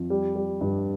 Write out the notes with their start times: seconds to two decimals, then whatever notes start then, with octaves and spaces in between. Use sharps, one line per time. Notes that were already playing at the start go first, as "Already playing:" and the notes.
Already playing: F2
0.10 G3
0.36 G3
0.61 G2